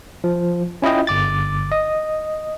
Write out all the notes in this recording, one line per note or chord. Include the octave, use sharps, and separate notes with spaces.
F3
C#4 E4 F4 D#5 G5
G1 D6 A6
D#5